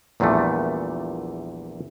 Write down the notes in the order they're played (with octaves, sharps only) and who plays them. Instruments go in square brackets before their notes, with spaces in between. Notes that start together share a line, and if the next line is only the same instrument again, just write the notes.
[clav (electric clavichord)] A#1 E2 A#2 G3 A3